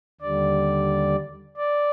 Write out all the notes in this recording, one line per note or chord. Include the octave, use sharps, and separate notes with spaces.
D#2 D3 G3 D5
D5